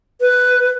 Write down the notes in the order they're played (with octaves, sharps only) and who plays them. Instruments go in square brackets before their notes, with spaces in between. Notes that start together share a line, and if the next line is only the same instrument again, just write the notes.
[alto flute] B4